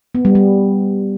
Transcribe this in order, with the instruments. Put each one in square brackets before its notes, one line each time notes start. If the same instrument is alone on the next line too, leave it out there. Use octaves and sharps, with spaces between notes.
[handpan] B3
G3
G3